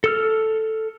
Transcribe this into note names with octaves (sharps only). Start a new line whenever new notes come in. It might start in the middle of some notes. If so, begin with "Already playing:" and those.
A4 E6 F6